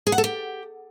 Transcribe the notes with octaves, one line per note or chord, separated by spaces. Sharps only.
G#4
F#5
A4
G4